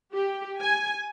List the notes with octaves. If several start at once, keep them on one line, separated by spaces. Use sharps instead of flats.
G4
G#5